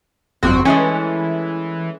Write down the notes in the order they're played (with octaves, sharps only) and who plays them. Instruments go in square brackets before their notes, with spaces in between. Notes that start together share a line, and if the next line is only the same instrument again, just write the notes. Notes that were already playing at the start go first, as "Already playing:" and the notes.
[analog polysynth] G1 F2 F#4 [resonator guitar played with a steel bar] C4
[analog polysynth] E3 [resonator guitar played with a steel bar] G#3 A3 C#4